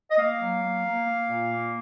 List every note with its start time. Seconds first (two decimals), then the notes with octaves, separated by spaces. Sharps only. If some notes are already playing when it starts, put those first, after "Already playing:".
0.11 D#5
0.17 A#3 F5
0.39 F#3
0.62 A#3
0.85 A#3
1.07 A#3
1.29 A#2
1.51 A#3